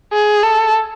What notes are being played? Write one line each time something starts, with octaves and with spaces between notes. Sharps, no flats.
G#4
A4